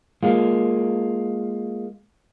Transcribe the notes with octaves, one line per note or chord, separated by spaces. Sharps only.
G#3 A#3 F4